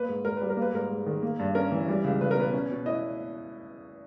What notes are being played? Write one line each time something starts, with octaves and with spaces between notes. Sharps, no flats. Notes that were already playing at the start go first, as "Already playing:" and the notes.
Already playing: A#3 B4
G#2
G#2 A#4
G3 B4
A#4
A#3
B4
G#2 A#4
G#2
D#3
A#3
G2
C#4 A#4
E3
G3
C#2
C#2 B4
A#4
B2 B4
C#4
B2
E4 D#5